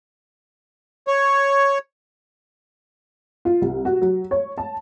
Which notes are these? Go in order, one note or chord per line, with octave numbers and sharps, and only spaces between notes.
C#5
F4
C2
F#4
F#3
C#5
A5